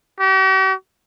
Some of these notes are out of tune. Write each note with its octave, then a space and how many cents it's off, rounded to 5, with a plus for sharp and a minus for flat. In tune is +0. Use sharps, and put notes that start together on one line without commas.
G4 -45